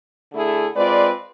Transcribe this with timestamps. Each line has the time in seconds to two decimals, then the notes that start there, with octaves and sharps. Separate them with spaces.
0.32 D3 A3 E4 G#4
0.76 G#3 C4 F4 B4 D5